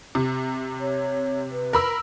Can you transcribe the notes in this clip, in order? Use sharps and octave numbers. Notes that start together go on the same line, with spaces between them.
C3
C#5
B4
A#4 B5 E6